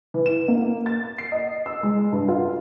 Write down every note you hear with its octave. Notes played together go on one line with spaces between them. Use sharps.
E3
E7
A#3
A6
C7
D#5
E6
G#3
G2
F4